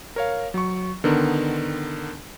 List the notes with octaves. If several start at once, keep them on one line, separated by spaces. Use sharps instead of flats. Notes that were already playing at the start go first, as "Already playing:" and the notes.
A#4 C#5 F5
F#3 C#6
D3 D#3 B3 A#4